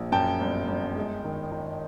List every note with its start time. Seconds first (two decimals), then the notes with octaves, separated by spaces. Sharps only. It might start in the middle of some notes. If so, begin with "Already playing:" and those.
Already playing: A#1
0.12 F#2 G5 A5
0.41 G1
0.68 G1
0.96 G#3
1.24 D#3
1.52 D#3